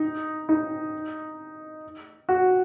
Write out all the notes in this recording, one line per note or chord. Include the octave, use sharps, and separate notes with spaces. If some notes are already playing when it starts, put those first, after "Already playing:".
Already playing: D#4
D#4
F#4